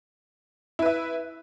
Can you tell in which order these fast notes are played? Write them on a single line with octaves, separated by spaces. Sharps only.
E4 B4 E5